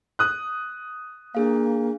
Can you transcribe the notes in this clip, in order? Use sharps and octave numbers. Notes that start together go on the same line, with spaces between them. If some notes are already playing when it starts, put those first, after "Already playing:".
D#6 F#6
A#3 D4 G#4 F5